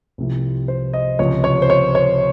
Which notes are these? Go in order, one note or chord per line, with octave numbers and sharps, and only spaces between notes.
C2 C3 F3
C5
D#5
C#2 C3 F3 C#5
C#5
C5
C#5
C#5